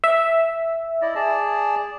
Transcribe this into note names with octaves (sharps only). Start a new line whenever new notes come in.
E5
E4 D5 D#5
G#4 D5 A5